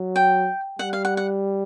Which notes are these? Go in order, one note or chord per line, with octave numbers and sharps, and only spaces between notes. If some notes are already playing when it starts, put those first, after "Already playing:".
Already playing: F#3
G5
G3 F#5
F5
F#5
F#5